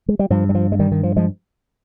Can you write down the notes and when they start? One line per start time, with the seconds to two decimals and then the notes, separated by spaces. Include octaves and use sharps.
0.08 G#3
0.19 G3
0.30 G2 F3
0.49 G3
0.55 F3
0.72 G#3
0.79 D#3 G3
0.92 D#3
1.03 F3
1.16 F3 G#3